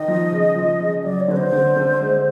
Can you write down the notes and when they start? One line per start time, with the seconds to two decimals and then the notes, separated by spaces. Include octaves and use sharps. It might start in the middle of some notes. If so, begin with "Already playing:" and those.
Already playing: D#3 D#5
0.08 F3
0.32 C#3
0.56 F3
0.80 C#3
1.04 F#3 D5
1.20 C#5
1.28 D3 B4
1.36 C5
1.52 D3
1.76 D3
2.00 G#3